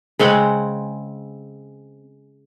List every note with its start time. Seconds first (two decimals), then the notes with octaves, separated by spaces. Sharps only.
0.19 C#3 G#3 C4 F#5